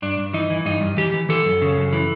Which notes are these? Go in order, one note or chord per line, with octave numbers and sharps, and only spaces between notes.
G2 D4
G2
E3 D#4
E3
G2 D#4
G2
E3 G4
E3
E3 A4
F#2
C#3
F#2
E3